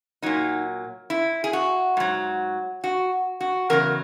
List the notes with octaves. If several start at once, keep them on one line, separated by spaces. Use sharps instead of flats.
A#2 F#3 D#4
E4
G#4
F#4
G#2 F#3
F#4
F#4
E2 C#3 F#3 A#4